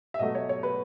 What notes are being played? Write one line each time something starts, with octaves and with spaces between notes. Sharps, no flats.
E5
B2 F#3 A3 D#5
C#5
C#5
B4